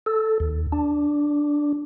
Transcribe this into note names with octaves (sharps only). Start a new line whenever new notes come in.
A4
D#2
D4